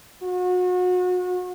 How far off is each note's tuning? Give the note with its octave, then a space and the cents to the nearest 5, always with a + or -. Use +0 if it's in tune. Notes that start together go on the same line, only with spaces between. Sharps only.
F#4 -35